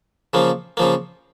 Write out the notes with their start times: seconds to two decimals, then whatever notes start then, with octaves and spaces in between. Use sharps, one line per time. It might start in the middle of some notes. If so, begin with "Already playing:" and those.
0.34 C#3 F3 A#3
0.77 C#3 F3 A#3